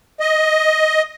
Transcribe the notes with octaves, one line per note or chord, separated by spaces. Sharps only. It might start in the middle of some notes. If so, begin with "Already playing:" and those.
D#5